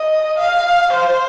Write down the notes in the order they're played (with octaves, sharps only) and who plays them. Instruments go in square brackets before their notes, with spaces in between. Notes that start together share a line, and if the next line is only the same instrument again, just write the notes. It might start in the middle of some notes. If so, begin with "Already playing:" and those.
Already playing: [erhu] D#5
F5
C5